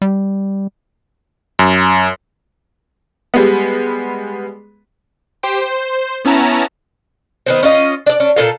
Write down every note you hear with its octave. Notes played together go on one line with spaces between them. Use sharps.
G3
F#2
G3 G#3 B3
G4 C5 G5
C5
B3 C#4 E4 A5 A#5
D#3 B3 C4
C#4 F4 D#5
D4 D5
C#4 D4
A#2 A3 A4 F5